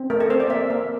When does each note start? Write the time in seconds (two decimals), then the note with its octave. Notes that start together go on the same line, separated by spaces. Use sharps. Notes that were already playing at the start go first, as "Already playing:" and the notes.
Already playing: C4
0.10 A3 A#4
0.20 A4
0.30 C4 C5
0.40 D5
0.50 A#3 E5
0.70 A#3